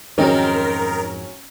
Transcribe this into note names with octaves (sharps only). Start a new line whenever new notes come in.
F2 G#2 D#3 F#3 C4 C#4 A#4